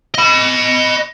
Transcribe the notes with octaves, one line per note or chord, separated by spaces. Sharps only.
D#5 B5